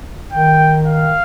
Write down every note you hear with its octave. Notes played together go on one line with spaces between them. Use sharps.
D#3 G5
F5